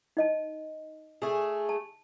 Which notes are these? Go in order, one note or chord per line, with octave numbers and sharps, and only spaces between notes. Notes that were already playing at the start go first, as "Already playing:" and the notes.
D#4 D#5 A5
A3 G#4
A5